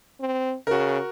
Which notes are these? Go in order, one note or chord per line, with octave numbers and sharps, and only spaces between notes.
C4
C#3 F#4 A#4